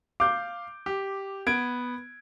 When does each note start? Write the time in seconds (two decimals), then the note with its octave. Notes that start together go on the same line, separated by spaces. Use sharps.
0.20 F5 D6 G6
0.86 G4
1.47 B3 G#6 D7